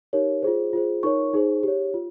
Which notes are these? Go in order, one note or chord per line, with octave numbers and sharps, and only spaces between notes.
D#4 G4 A#4 C#5
F4 G#4 C5
F4 G#4 C5
D#4 A#4 C#5 C#6
D#4 G#4 C5
G4 C#5
F4